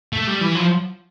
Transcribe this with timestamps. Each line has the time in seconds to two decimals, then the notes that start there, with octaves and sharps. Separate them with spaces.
0.13 A3
0.27 G3
0.41 E3
0.55 F3